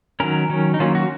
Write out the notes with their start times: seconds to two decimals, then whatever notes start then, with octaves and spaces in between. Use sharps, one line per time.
0.20 D#3 F#3 C#4 A#4
0.50 D#3 F#3 C#4
0.74 D#4
0.80 D#3 F#3 A#3 C#4 F4
0.95 F#4